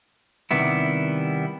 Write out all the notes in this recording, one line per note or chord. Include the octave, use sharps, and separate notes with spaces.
C3 D#3 G3 B3 E4